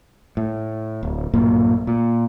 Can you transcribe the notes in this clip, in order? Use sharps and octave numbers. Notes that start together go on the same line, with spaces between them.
A2
D1
B1 G2 A#2 A#3
A#2